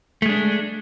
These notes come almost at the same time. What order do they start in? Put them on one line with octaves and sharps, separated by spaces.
A3 G#3 D4